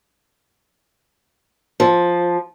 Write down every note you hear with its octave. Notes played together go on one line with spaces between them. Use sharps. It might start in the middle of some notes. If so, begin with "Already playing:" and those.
F3